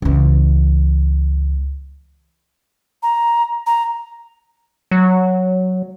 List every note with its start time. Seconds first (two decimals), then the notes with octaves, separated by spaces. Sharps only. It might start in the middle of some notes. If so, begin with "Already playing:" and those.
0.02 C#2 E3
3.03 A#5
3.67 A#5
4.91 F#3